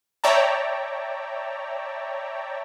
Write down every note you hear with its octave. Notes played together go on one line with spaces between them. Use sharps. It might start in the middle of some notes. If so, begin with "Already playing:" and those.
C#5 D5 E5 G5 A5 A#5